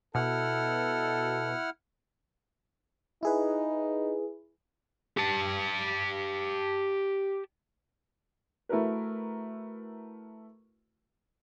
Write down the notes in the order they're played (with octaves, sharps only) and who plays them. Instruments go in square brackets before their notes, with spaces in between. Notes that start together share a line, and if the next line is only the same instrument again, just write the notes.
[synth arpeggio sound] B2 [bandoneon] E4 F#5 F6 [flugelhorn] A4
[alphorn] D#4 [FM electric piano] E4 G#4 B4
[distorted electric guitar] G4 A5
[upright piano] A3 E4 F#4 A#4 B4